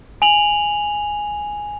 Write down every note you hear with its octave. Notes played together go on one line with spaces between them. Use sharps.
G#5 F7 F#7